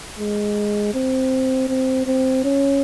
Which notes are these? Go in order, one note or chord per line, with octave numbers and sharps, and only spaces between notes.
G#3
C4
C4
C4
C#4